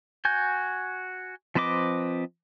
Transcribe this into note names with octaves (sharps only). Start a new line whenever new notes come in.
F#4 G#5 G6
F3 C4 B4 D#5 D6